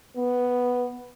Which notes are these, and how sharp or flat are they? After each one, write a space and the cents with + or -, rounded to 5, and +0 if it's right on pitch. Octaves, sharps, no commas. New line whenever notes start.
B3 +0